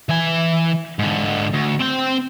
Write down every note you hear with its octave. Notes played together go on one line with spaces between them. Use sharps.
E3 G#5
G#2 D3
D2
C4 G5